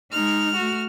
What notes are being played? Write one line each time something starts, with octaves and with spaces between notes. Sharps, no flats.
G#3 D#4 F6
A3 F#4